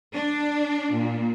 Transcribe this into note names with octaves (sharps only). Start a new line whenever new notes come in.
D4
A#2